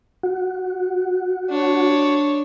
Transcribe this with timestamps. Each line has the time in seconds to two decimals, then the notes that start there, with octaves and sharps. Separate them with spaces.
0.23 F#4
1.50 D4 C#5